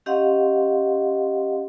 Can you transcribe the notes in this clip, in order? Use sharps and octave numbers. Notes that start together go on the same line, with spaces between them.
C#4 G4 D#5 F5 F#5 C6